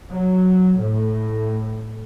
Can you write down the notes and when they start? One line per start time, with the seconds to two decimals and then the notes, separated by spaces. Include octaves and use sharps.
0.11 F#3
0.78 A2